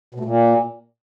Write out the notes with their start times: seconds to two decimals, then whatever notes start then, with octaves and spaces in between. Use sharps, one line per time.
0.14 B2
0.20 A3
0.25 A#2